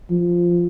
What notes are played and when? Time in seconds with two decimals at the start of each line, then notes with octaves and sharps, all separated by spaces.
0.11 F3